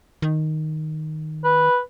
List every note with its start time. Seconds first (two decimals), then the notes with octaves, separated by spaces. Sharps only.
0.22 D#3
1.44 B4